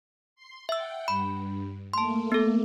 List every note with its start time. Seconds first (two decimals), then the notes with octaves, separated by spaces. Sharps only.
0.35 C6
0.69 E5 F#5 G5 E6
1.08 G2 B5
1.94 A3 A#3 A5 C6
2.32 B3 A4